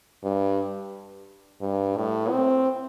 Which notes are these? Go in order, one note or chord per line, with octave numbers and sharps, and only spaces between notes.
G2
G2
A2
C4